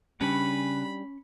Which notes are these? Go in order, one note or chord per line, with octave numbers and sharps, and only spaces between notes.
C#3 G3 C#4 D4 B4 B5